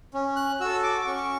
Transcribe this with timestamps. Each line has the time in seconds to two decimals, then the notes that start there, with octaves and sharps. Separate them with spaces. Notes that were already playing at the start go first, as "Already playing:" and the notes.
0.14 C#4
0.36 F#6
0.60 F#4 A4 E6
0.83 D6
1.01 D6
1.06 C#4 C#6